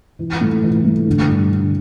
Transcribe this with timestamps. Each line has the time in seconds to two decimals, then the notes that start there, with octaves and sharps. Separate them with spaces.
0.19 E3
0.41 A2
0.63 E3
0.85 A2
1.07 D3
1.28 G2
1.50 D3